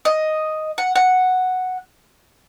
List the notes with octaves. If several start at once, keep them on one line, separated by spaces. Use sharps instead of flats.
D#5
F#5
F#5